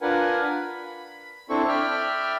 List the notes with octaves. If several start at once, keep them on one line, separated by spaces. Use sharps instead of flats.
D4 F4 A#4 B4 F#5 G#5
B5
C4 D4 E4 A4 C5 C#6
D5 E5 G5 B5 F6